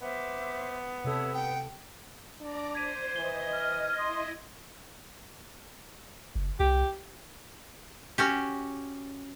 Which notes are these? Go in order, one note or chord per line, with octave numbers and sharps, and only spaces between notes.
B3 C5 E5 D6
C3 E4 A4 C#5 D#6
F#5 G5
D4 D5 A#5 D6
C5 G#6 B6 D#7
E3 D#5 G7
F6
E4 D#5 C6 D#6 A#6
F#1
C2 G4
C#4 F#4 G4